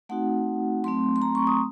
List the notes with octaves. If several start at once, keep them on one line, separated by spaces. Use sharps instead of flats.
A3 C4 D#4 F#4 F#5
F#3 A3 C4 C6
C6
A#5
C#6
D#6